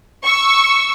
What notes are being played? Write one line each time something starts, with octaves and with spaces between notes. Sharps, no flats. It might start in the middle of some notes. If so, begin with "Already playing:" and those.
C#6 E6